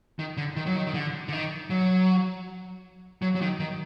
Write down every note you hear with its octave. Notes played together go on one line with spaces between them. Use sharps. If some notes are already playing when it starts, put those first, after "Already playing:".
D#3
D3
D#3
F#3
D#3
D#3
D3
D3
D#3
F#3
F#3
F#3
D#3
D#3